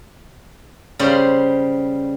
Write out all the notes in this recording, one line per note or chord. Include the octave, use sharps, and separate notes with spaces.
C#3 G3 C5